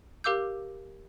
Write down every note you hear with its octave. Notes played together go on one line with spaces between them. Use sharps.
G4 A#4 F5 D6 E6 G6